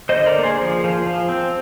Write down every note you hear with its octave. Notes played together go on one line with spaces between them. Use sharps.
C5 D#5
D3
A#4 D5
A#3
G#4 C5
F3
F3
F3
C4